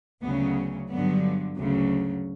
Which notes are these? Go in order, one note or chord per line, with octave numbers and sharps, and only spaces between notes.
D2 C#3 F#3 B3
G2 D3 F#3 B3
D2 C#3 F#3